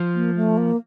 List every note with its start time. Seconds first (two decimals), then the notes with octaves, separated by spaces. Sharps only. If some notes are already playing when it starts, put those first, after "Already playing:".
Already playing: F3
0.15 A#3
0.36 A3
0.57 A#3